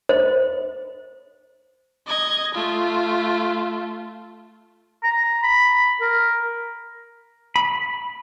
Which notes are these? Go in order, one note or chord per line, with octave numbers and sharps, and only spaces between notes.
C5
D#5 G#6
A3 F4
A#5
B5
A#4
B5